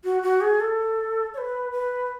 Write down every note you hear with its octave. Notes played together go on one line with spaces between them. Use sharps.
F#4
F#4
G#4
A4
C#5
B4
B4